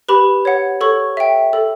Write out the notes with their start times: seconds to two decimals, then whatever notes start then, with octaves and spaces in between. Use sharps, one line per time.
0.09 G4 B4 B5
0.45 C#5 F#5
0.81 A4 C#5 C#6
1.17 E5 G5
1.53 A4